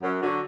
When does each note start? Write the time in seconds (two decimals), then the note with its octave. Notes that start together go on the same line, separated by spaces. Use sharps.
0.02 F#2
0.21 D3 F#3